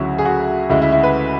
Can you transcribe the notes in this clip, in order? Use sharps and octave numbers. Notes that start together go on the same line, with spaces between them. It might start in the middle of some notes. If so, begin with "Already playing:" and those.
Already playing: D2 C#3 F#3 E4
G#4
F#4
D2 C#3 G#3 E4
E4
E4
B4